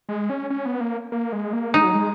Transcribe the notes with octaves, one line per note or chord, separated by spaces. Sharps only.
G#3
C#4
C#4
B3
A#3
A#3
G#3
A#3
G#3 D#4
F#3
G#3